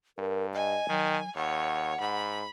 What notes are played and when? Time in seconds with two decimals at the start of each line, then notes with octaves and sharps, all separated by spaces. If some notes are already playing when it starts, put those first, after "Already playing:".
0.18 G2 A#4
0.54 D#5 G#5
0.89 D#3 F#3
1.36 D#2 C#5 F#5
2.00 G#2 B5